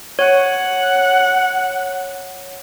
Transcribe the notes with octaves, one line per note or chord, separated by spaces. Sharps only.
C#5 F#5